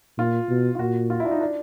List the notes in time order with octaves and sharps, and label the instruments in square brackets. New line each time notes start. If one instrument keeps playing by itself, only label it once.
[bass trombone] A#2 [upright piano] F4
[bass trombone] B2
[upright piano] F4
[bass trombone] A#2 [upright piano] F#4
[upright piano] F4
E4
D4
D#4
D4